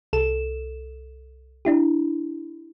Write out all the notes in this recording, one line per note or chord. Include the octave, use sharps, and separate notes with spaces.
C2 A4 E7
D4 E4 G4